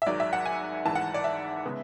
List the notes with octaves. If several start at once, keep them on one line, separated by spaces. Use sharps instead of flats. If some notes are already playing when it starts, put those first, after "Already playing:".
E5
G#1 G#2 F#3 D5
E5
F#5
G#5
G#1 G#2 E3 A5
F#5
D5
E5
C#3 G#3 B3